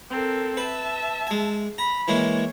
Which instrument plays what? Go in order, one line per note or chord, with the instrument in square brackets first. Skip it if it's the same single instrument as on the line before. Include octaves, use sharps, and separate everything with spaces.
[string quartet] C4 A4 A#4
[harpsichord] B4 [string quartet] E5 A5
[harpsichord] G#3 G#5
[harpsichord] A#5 [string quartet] B5
[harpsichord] E3 G#3 A#3 [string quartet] C#5